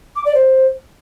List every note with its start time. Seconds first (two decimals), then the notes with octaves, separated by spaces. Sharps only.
0.15 D6
0.25 D5
0.34 C5